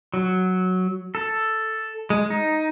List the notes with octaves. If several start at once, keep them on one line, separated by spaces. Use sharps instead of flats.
F#3
A4
G#3
D#4